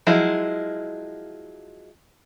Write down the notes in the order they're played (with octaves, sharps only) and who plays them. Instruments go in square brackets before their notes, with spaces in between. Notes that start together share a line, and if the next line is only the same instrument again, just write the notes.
[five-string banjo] F3 F#3 G#3 E4